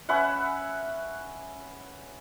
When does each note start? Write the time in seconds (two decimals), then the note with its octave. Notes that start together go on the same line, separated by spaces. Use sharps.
0.09 C#4 B4 E5 F#5